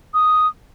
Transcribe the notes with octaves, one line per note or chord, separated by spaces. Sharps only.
D#6